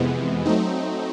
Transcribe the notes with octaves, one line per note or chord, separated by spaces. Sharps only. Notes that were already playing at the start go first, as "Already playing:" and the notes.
Already playing: F2 C3 E3 G#3 B3
F#3 A3 C4 D#4